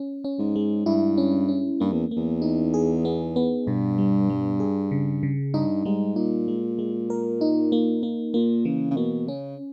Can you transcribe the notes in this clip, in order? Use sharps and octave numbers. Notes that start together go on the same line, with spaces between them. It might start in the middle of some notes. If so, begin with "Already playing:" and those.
Already playing: C#4
C#4
G#2
G#3
G2 E4
C#4
C#4
G2 A#3
E2
E2 A#3
D#4
G#4
B3
B3
G2 B2
G3
G3
G#4
C#3
C#3
G2 D#4
G#2 G3
A#2 D#4
G#3
G#3
A#4
D#4
A#3
A#3
A#2 A#3
C#3 E3
C#3
B2 A#3
C#3 C#4